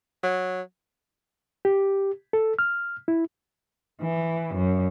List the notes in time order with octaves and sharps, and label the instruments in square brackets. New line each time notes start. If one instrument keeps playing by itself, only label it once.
[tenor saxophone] F#3
[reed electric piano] G4
A4
F6
E4
[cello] E3
F#2